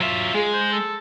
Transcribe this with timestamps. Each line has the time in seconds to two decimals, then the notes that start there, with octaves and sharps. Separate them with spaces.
0.01 F#3 F4 E5
0.34 G#3 G#4
0.53 C5
0.72 A4